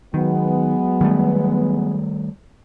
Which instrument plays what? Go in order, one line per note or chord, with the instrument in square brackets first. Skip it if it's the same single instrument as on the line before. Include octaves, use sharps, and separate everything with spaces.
[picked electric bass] D#3 [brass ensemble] F#3 G#3 B3
[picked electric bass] D#3 G3 A3